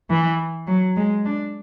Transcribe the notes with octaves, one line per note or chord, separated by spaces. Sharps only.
E3
F#3
G#3
D4